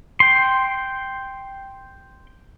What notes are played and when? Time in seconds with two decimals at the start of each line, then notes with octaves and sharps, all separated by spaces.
0.20 G5 C6